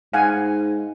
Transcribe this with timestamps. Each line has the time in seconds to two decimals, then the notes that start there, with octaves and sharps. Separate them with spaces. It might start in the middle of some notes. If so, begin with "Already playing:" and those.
0.13 G#2 F5 F#5 G#5